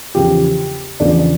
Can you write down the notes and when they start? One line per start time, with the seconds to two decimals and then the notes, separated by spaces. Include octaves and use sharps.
0.14 E2 C#3 F3 G4
1.00 E2 C#3 F3 D4